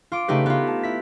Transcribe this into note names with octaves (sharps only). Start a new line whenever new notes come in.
F4 D6
C#3 A3 D#4 G4 B4
B3 F4
A5
E4 B6